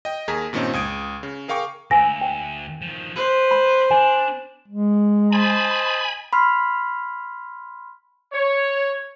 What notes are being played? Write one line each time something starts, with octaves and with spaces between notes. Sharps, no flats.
D#5 G5
D#2 G#4 A#4 A#5 G#6 B6
G2 A#2 D#3 C4 C#4 D#4
C#2 D#6 G#6 D7
C#3
G#4 A#4 F5 G5 C#6 D6
D2 F5 G#5 E6 A#6
G5
D#3 F3
B4 C5
B5
D4 G#5
G#3
C5 D#5 G#5 A5 B5
B5 C6 F6
C#5